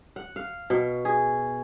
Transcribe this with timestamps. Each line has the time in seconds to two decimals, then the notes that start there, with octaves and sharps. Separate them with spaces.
0.16 F#5
0.36 F5
0.70 B2
1.05 G#4